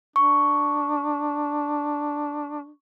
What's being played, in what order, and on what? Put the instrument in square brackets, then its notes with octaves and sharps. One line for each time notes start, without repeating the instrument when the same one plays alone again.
[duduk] D4 [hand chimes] C#6